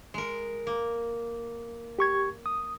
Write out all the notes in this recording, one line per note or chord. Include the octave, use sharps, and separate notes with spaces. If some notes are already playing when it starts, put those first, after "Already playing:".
G#3 A#4
A#3
G4 C#6 G#6
D#6